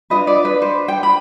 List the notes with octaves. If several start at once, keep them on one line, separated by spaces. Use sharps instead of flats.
D4 F4 B4 D#5
D5
B4
C5
G5
B5